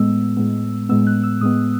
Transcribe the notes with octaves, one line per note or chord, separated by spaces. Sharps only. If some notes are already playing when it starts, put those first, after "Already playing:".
Already playing: A2 G#3 B3 E6
A2 G#3 B3
A2 G#3 B3 E6
F#6
E6
A2 G#3 B3 D#6